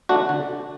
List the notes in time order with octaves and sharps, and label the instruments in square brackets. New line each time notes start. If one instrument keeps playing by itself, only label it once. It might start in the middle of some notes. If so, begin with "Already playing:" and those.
[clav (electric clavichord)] A3 D4 F#4
D3